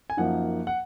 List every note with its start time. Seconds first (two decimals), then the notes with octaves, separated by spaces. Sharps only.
0.10 G#5
0.17 F#2 F3 A#3 D#4 F#5
0.67 F#5